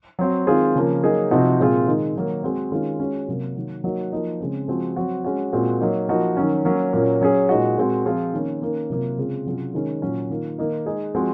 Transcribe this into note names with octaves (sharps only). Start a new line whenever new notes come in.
F#3 C4 F#4
D#3 G#3 C4 F4 G#4
C#3 F3 A#3
F#3 A#3 D#4 G#4
C3 F3 C4 D#4 F#4
A#2 G#3 C4 F4 G#4
D#3 G#3 D#4
D#3 F#3 A#3
G#3 C4 F#4
D#3 G#3 C#4 F4
G#3 C#4 F#4
C3 F#3 A#3
D#3 F#3 A#3
F#3 A#3 D#4 F#4
F3 A#3 D#4
C#3 G#3 C4
F3 G#3 C4 F#4
F#3 C4 F#4
G#3 C#4 F#4
A#2 G#3 C4 F#4
F#3 A#3 D#4
F3 A#3 D#4 F#4
D#3 F#3 C#4
F#3 A#3 C#4
A#2 F#3 A#3 C#4
F#3 C#4 G#4
A#2 G#3 D#4 F#4
A#2 G#3 C4 F#4
F3 C4 F4 G#4
D#3 A#3 C#4
D#3 A#3 C#4
C3 F#3 A#3 F4
C#3 G#3 C4 F4 G#4
C3 F#3 C#4 F4 G#4
D#3 G#3 C#4
A#2 F#3 C#4
D#3 A#3 F4
D#3 A#3 D#4
G#3 D#4 G#4
F3 G#3 C4 F#4